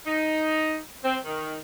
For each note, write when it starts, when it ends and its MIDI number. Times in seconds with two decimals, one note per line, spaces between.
0.06 0.78 63
1.04 1.17 60
1.25 1.57 51